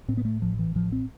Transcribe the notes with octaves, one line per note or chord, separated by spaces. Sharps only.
A2 C4
B3
A3
A1 F3
E3
A2 F3
C4